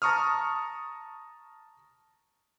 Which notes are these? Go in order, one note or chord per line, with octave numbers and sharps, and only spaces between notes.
A5 A#5 C#6 D#6 F6